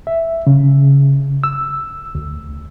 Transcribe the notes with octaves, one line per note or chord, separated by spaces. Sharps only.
E5
C#3
E6
D2